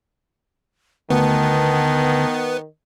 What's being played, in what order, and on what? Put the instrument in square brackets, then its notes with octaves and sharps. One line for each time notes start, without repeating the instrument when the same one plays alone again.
[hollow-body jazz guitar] D2 [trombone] D#3 [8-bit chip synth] B3 [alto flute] A5